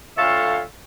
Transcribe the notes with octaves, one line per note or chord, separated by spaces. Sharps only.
D2 F4 A4 C#5 E5 F5